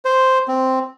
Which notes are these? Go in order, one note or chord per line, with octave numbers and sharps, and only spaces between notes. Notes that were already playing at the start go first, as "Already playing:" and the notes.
C5
C4